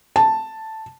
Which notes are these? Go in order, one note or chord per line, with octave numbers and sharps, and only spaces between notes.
A5